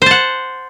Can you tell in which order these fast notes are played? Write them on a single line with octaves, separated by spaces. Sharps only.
C5 A5 F#5